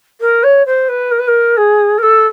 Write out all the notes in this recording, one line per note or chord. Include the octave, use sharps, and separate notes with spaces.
A#4
C#5
C5
B4
A#4
B4
A#4
G#4
A#4
A4